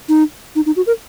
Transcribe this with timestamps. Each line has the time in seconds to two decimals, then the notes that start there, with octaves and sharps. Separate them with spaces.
0.09 D#4
0.56 D#4
0.66 D#4
0.76 F#4
0.87 A#4